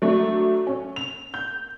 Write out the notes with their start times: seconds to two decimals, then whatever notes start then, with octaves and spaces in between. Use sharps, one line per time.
0.02 F#3 A3 D4
0.67 C#4
0.96 F7
1.34 G6